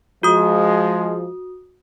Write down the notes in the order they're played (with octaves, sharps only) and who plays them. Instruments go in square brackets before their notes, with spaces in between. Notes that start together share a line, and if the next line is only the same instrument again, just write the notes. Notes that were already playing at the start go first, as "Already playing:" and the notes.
[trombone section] F3 G#3 [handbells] F#4 D#6